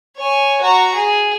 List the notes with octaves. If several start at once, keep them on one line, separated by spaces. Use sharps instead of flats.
C#5 G#5
F#4 A#5
G#4